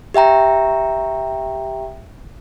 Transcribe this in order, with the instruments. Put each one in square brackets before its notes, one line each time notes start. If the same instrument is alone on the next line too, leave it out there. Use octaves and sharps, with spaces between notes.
[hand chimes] G4 E5 G5 A#5